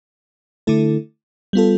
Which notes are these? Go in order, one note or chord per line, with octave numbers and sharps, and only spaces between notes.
D3 A3 E4 A4
G3 B3 F4 A4